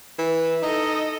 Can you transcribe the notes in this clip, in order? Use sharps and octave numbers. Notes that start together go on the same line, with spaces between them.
E3
D#4 A4 D#5